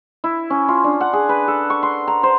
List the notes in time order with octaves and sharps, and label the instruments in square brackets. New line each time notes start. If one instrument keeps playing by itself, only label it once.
[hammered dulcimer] E4
C#4
F4
D4
F#5
G#4
B4
A4
C#6
C6
A#5
C5